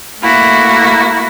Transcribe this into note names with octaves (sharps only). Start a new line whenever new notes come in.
A3 A#3 E4 F#4